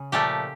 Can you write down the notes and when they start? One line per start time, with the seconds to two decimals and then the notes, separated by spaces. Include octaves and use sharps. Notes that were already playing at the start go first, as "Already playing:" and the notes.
Already playing: C#3
0.12 A#2 F3 A3 G4